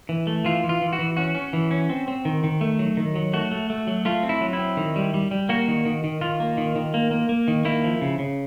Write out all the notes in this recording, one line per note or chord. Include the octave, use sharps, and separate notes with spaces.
E3
A3
E3 F4
E3
F4
E3
F#4
E3
C#4 F#4
C#4
E3
C#4
C4
C4
D#3
D#3
A3
F#3
D#3
F#3
A3 F#4
A3
A3
F#3
A3 F4
C4
E4
F#3
E4
C4
D#3
G3
G3
G3
A#3 F#4
D#3
D#3
D#3
D#3 F4
A#3
D#3
D#3
A#3
A#3
A#3
D#3
A#3 E4
F3
C#3
C#3